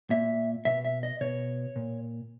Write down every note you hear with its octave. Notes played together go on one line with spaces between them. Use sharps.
A#2 E5
B2 E5
E5
D#5
B2 C#5
A#2